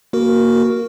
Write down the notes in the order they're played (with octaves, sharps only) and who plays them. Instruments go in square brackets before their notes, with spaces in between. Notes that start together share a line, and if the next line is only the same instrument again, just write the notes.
[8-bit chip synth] A#3 F#4 A#4